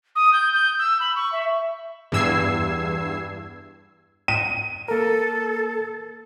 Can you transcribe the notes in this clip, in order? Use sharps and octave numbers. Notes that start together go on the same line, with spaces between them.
D#6
G6
G6
E6
B5
C#6
E5
E2 G2 E6 G#6 C7
D#7
A#3 A4 A#4